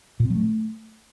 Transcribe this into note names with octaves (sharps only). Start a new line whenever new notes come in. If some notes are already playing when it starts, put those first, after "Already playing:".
A#2
C4
F#3
A3